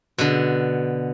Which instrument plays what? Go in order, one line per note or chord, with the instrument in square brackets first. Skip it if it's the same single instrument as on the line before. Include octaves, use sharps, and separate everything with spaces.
[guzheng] B2 D3